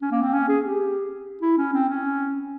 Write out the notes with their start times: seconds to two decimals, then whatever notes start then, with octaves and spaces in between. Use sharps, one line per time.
0.02 C#4
0.12 A#3
0.22 C4
0.33 C#4
0.49 G#4
0.65 G4
1.42 E4
1.57 C#4
1.73 C4
1.89 C#4